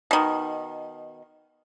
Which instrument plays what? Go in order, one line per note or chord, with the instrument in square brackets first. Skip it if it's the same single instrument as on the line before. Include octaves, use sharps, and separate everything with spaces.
[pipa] B2 D#3